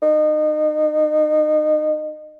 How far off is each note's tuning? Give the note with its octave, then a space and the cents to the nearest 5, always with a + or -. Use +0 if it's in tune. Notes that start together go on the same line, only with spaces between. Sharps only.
D#4 -30